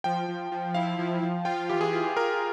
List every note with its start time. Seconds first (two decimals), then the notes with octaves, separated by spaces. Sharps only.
0.04 F3 G5
0.28 F3
0.52 F3
0.74 E4 F5
0.99 F3
1.23 F3
1.45 F4 G5
1.70 E3 G4
1.81 G#4
1.93 F4
2.16 F4 A#4